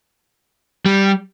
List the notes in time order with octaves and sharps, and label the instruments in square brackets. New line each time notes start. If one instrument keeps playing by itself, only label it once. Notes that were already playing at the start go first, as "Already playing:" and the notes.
[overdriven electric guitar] G3